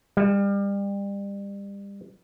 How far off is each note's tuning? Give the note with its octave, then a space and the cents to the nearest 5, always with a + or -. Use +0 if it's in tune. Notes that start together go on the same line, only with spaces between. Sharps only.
G3 +30